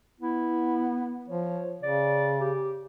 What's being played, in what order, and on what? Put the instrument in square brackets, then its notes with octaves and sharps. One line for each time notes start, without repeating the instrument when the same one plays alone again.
[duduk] B3 [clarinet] E4
[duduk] F3 [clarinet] C#5
[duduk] C#3 [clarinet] D5
[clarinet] G4